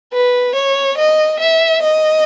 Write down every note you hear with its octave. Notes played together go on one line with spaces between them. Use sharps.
B4
C#5
D#5
E5
D#5